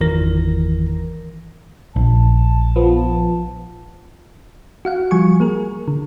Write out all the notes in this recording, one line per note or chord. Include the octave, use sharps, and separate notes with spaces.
G1 E2 D#3 E3 A#4 A#6
A#1 A5
F3 B3
F#4 F5 F#5
F3 G3 G#5 C#6
A#3 G#4 A#4
D3